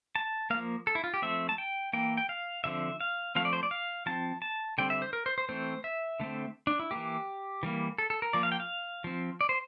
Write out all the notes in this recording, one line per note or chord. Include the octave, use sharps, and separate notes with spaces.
A5
F3 A#3 F5
A4
E4
F4
G4
F3 A3 C4 E5
A5
G5
E3 A#3 G5
G5
F5
D3 F3 C4 E5
F5
F3 A3 C4 F5
D5
C5
D5
F5
F3 C4 A5
A5
D3 G3 C4 G5
E5
C5
A#4
C5
C5
E3 A3 C4 C5
E5
D3 A3 C4
D4
E4
E3 A#3 G4
E3 G3 A#3
A4
A4
A#4
F3 A#3 D5
F5
G5
F5
F3 C4
D5
C5